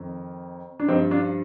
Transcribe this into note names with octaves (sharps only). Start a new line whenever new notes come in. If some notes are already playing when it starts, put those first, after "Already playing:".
Already playing: F2 D#3
D4
G2 F3 C4 D#4
D4 F4